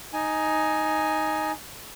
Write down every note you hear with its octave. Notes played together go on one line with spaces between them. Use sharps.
D#4 G#5